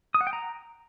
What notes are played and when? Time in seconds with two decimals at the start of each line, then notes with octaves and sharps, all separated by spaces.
0.14 D#6
0.21 F#5
0.27 G5
0.33 A#5